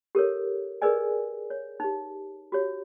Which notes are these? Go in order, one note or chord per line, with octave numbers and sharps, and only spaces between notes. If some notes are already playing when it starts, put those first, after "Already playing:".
G4 A4 A#4 C#5
G#4 A#4 B4 D5 D#5 G#5
C#5
D#4 G4
F#4 G4 C#5